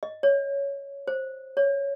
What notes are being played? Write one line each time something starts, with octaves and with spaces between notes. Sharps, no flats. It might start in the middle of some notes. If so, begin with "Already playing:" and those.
D#5
C#5
C5
C#5